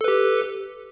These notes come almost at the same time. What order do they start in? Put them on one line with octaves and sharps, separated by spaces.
A4 B4 G4